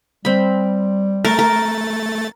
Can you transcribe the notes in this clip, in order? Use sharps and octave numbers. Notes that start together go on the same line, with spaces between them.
G3 C4 B5
A3 A#4 A6
A#4